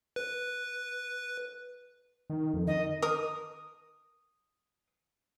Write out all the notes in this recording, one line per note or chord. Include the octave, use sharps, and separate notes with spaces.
B4
D#3
F2
D#3 D#5
A#4 D#6